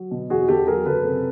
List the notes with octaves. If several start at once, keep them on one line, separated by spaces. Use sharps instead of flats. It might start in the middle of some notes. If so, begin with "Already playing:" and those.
Already playing: F#3
B2
E2 F#4 G#4
E2 G4 A4
F#3 G#4 A#4
F#1 A4 B4
C3